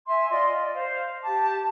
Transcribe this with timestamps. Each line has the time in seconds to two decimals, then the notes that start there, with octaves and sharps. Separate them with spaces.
0.06 E5 G#5 C6
0.29 F4 D5 D#5 C6
0.58 D5
0.73 C5 F5
1.22 G4 A5 D6